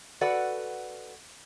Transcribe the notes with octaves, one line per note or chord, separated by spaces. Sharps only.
F#4 A4 B4 D5 F#5